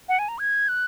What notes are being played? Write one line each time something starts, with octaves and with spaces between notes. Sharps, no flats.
F#5
G#5
A#5
G#6
F#6